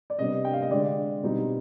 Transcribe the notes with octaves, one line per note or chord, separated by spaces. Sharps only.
D5
C3 G3 B3 D4 D#5
G5
F5
D#5
D3 G#3 D4 D5
B2 G3 C4 D#4